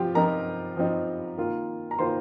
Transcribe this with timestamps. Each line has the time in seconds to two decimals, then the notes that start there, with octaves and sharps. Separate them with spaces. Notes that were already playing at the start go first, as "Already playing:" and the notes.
Already playing: F3 C4 F4 G4 G5
0.15 F3 C4 D#4 A#4 A#5
0.77 F3 C4 D#4
1.38 D#3 A#3 F4
1.91 A#5
1.99 D#3 A#3 F4 C5 C6